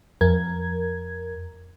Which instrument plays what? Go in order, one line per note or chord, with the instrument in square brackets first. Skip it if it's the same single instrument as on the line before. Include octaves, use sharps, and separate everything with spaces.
[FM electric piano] F2 A#4 G#6